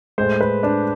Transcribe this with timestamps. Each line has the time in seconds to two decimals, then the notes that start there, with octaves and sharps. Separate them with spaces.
0.18 A2 G#3 C5
0.41 B4
0.63 D4